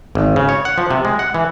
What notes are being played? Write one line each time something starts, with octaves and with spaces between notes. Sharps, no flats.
G#1
C#3
C#5
F#5
F3
C3
G#3
F#5
E3